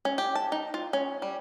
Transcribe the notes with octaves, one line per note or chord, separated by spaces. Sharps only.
C#4
G4
A5
D#4
F4
C#4
G3